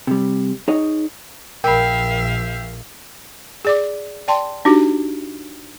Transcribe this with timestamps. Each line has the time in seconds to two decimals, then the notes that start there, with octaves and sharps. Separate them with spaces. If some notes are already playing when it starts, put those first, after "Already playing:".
0.07 C3 G3
0.68 D#4 G#4 C#5 D#5
1.64 A#1 A#4 E5 F5 G5 B5
3.65 G#4 D5 D6
4.28 D5 G5 A5 C6
4.65 D4 D#4 F#4 G4